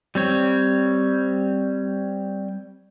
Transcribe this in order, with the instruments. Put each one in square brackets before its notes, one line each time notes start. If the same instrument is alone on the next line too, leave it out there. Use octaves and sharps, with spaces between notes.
[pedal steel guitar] G3 C4 C#5